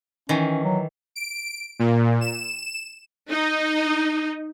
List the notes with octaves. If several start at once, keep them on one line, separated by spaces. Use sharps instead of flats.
D#3 E3 C#4
F#3
D7
A#2
E7
D#4